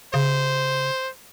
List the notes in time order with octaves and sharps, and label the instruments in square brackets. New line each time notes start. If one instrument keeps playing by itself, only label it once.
[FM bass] C#3 [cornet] C5